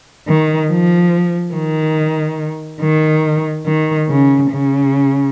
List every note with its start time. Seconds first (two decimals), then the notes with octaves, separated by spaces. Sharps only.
0.28 D#3
0.70 F3
1.54 D#3
2.81 D#3
3.66 D#3
4.09 C#3
4.51 C#3